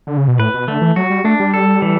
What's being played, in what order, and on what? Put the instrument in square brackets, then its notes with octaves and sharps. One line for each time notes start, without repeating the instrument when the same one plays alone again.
[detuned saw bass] D3
C#3
B2
[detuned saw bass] A2 [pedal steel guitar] B4
[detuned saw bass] B2
[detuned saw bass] D3 [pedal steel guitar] A3
[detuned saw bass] E3
[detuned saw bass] F#3 [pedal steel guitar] F#4
[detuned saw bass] G3
[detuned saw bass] A3 [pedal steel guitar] D4
[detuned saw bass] G3
[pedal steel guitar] A4
E3